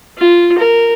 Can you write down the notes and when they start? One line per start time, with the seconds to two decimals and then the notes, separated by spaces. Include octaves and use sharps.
0.18 F4
0.58 A#4